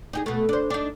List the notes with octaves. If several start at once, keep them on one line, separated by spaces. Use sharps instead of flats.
D#4 G4 G#4
B2 A3
D4 C5
D4 D#4